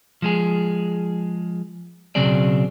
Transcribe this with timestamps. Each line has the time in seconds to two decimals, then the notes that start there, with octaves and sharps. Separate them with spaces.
0.22 F3 G#3 G#4
2.15 B1 C#3 F#3 C4 G#4 D5